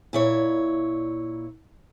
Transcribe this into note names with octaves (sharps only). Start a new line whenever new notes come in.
A#2 E4 C#5